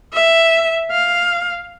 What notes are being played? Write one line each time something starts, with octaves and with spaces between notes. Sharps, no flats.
E5
F5